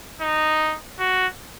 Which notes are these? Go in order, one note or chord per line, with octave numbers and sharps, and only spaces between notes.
D#4
F#4